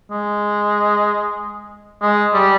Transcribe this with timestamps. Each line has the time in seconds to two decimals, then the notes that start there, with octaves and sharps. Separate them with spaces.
0.11 G#3
2.02 G#3
2.34 G3